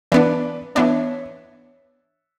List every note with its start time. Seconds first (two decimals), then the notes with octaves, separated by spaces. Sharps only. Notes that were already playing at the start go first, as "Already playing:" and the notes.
0.12 E3 B3 D4 B4 D5
0.75 E3 B3 D4 C#5 E5